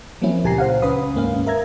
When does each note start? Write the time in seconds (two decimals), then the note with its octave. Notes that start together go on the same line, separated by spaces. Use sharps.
0.22 F3 F#3 A#3 C4 C#4 E4
0.44 C#2 A#2 G4 G#5 A#5 C7
0.58 C5 F5 F#5
0.82 C#2 C#4 B4 B5 D#6
1.14 D#2 G#2 A#3 C#4 F5
1.46 A#4 E5 A#5 G#6